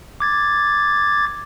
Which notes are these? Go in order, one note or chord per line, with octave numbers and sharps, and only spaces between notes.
D6 G#6 A6